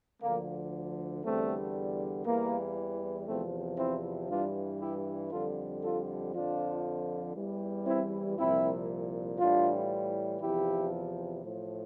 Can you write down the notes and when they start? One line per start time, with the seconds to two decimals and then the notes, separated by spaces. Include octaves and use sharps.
0.22 D2 D3 F3 A#3
1.24 E2 D3 G3 A3 C4
2.26 E2 E3 G3 A#3
3.27 E2 C3 F3 A3 C4
3.78 C4 E4
4.30 G2 E3 G3 D4 F4
4.81 E4 G4
5.31 F2 D3 G3 F4 A4
5.82 F4 A4
6.34 F2 D3 F3 D4 F4
7.35 E2 E3 G3
7.86 C4 E4
8.37 C2 A#2 F3 C4 E4
9.39 A2 E3 G3 D4 F4
10.41 E2 C3 F3 E4 G4
11.44 A2 F3